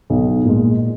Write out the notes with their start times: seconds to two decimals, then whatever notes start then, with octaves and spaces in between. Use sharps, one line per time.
0.10 B1
0.45 A#2 G#3